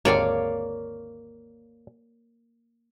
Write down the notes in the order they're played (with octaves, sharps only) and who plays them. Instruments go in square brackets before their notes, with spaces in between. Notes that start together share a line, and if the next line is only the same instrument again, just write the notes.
[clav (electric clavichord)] G#1 D#2 D3 [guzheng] A#3 [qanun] C#5 D5 F5